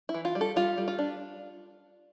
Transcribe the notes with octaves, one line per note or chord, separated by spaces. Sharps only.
E4
E3
F4
G3
A4
G3 F4
G3
F4
D4